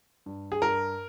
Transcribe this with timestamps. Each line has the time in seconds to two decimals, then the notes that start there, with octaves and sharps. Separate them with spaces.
0.26 G2
0.52 G#4
0.62 G2 A#4